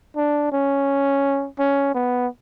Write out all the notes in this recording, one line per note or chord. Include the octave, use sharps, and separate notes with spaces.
D4
C#4
C#4
B3